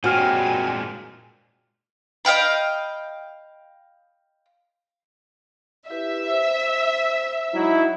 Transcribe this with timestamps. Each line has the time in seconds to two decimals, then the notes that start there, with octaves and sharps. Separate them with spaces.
0.04 G2 A#2 G#3 C4 F#4 G#5 F6
2.25 D#5 F5 G5 B5
5.90 E4 G4 B4 E5
6.30 C5
7.54 F#3 G#3 D#4 E4